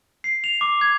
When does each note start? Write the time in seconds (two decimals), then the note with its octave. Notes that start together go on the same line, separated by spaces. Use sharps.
0.24 C7
0.44 F7
0.61 D6
0.81 G#6